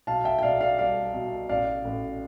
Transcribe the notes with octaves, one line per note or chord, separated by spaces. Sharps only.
B1 F5 A5
E5 G5
G5
B1 D5 F5
D5 F5
G3 D5 F5
B2
A1 D5 F5
A1